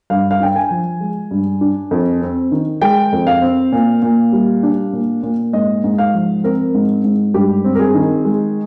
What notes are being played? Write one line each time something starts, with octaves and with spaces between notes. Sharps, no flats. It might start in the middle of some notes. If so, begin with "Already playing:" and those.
G2 F5
F5
D4 G5
G#5
F3
G#3
G2
D4
F2
C4
D#3
G#3 G5
F2
F5
C4
A#2
A#2
G3
D4
A#2
A#2
G#2 D#5
G#2
F5
F3
C4 A#4
G#2
G#2
G2 G4
C4
A#4
G#4
D#3
G#3